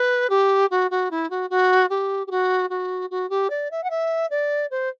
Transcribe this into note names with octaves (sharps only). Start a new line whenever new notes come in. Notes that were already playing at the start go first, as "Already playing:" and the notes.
Already playing: B4
G4
F#4
F#4
E4
F#4
F#4
G4
G4
F#4
F#4
F#4
G4
D5
E5
F#5
E5
D5
C5